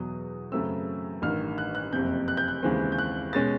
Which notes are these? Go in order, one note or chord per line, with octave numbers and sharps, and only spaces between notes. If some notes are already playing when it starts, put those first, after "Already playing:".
Already playing: E2 B2 F#3 D#6
F#2 C#3 F#3 A3 C4 E6
A1 G2 D#3 F6
F#6
F#6
F#1 F2 C3 G6
F#6
G6
F#6
D#2 C#3 E3 G#3 C4
G6
F#6
B2 G#3 C#4 A6